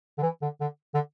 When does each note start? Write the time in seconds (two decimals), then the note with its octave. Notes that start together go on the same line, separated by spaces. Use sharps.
0.18 D3
0.22 E3
0.42 D3
0.61 D3
0.94 D3